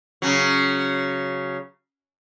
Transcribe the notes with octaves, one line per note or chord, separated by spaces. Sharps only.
C#3 F#3